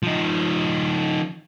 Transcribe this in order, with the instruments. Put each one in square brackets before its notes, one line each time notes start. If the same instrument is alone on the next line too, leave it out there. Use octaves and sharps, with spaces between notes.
[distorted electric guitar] F3 D#4